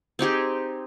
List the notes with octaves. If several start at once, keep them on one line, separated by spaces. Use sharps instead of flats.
C4 D#4 G4 G#4